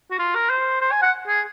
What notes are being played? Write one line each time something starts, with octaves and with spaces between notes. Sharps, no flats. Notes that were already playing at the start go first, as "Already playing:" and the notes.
F#4
F4
A#4
C5
C5
G#5
F#5
G#4